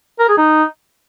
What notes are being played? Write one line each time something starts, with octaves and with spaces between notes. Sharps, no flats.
A#4
G#4
D#4